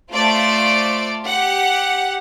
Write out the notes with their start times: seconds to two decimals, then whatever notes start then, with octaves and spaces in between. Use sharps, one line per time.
0.13 A3 F4 C5 D5 D7
1.25 G4 F#5